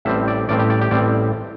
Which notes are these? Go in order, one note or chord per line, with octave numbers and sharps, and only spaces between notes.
A1 A2 G3 C4 E5
D5
A1 A2 G3 C4 D5
G4
D5
G4
A1 A2 G3 C4 D5